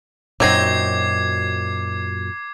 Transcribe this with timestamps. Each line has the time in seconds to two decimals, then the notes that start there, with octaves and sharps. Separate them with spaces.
0.40 F#2 A#2 F#3 C4 D#4 D6 G#6 C7